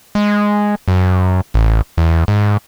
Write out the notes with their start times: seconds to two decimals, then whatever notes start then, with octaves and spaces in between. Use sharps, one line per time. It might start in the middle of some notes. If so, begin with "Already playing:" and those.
0.15 G#3
0.88 F#2
1.54 A1
1.98 E2
2.28 G#2